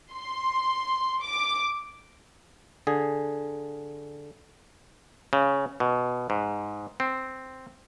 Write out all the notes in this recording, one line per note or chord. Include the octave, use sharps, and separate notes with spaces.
C6
D6
D3 G#4
C#3
B2
G#2
C4